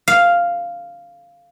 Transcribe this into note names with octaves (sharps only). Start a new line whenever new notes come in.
F5